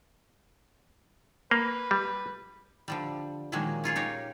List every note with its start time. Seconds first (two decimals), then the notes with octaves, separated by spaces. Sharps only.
1.51 A#3 B4
1.91 G3
2.88 D3 F3 G3
3.52 A#2 D#3 F3 F#3 G#3 A#3
3.84 C#4 F4 G#4 C#5
3.96 D#4 G4 A#4 C#5